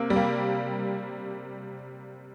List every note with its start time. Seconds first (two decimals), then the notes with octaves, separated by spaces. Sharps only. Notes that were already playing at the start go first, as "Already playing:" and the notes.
Already playing: C3 A#3
0.10 G3
0.16 A#3